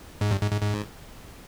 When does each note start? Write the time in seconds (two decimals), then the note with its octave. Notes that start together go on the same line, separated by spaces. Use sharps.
0.21 G#2
0.31 G2
0.42 G#2
0.52 G#2
0.62 G#2